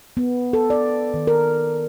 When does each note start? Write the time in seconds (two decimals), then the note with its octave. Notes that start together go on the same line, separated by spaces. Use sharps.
0.17 B3
0.53 A4
0.70 D5
1.14 D#3
1.27 A#4